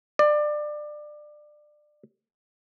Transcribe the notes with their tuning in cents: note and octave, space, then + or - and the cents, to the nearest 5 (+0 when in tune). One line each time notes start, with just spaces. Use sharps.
D5 +25